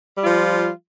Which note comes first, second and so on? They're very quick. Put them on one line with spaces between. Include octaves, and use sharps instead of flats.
G3 F4 F3